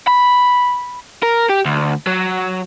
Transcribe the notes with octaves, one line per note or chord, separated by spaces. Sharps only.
B5
A#4
G4
D2
F#3